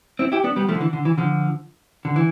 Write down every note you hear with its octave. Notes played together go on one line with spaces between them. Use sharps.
C4 E4
E4 G4
B3 D4
G3 B3
F3 A3
D3
E3
D3
E3
D3 F3
D3
E3